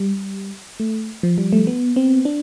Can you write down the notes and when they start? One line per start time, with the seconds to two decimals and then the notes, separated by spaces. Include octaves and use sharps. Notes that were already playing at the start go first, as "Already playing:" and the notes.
Already playing: G3
0.80 A3
1.23 F3
1.38 G3
1.53 A3
1.67 B3
1.96 C4
2.25 D4